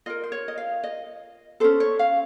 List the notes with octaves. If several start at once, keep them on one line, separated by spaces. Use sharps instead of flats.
F4 A#4 D#5
C5
C#5
D#5
F5
D#5
C#4 A4 C5
C#5
F5